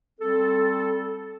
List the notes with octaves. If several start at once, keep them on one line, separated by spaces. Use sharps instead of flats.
G3 C4 A4